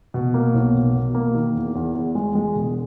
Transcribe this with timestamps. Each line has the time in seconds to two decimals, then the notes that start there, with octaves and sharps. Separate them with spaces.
0.14 B2
0.34 A#3
0.54 B1
0.74 B2
0.94 B2
1.15 A#3
1.35 D#3
1.55 E2
1.75 E2
1.95 E2
2.15 G#3
2.35 G#3
2.55 E1